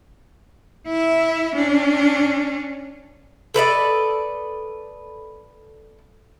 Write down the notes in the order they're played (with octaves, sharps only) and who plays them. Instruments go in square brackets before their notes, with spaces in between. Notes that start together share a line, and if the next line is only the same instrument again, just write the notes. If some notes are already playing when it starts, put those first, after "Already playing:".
[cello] E4 E5
C#4 D4
[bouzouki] A4 B4 D5 D#5